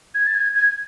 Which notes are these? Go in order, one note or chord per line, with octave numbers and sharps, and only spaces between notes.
G#6
A6
G#6
G#6